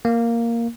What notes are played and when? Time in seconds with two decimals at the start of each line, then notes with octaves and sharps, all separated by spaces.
0.05 A#3